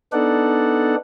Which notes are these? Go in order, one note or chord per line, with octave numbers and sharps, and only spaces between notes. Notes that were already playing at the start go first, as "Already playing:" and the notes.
B3 D4 D#4 A4 D5 F#5